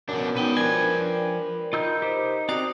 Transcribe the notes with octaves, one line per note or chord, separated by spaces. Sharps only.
F#2 B2 D4
B3 D#4 B4 G5
F3 D4 A#4 G#5
D#4 F4 E6 G6
G4 C5
C4 F#4 C5 D5 A#5 D#6